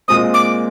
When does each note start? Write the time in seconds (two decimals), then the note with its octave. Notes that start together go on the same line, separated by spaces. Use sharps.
0.08 A#2 G#3 C4 D#6
0.34 D6